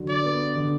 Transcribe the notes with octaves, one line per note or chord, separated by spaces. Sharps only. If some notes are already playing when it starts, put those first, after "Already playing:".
Already playing: D3 F#3
D5
B3
D3